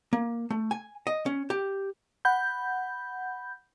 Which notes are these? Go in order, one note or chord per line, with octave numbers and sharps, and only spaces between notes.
A#3
A3
G#5
D#5
C#4
G4
F#5 B5 G6